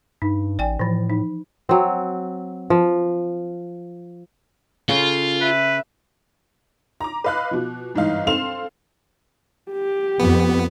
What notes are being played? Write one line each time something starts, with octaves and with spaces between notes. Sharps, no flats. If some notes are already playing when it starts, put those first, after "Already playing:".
G2 D#4
A1 D5 G5 G#5
A2 E3 F3
D#4
F#3 C4
F3
C#3 F4 A4
B4 E5
A#5 D6
B4 D#5 F5 B5 F#6
B2 F3
G1 G#2 E3 D#4 F5
C4 A4 F5 C6 E7 F7
G4
F2 B3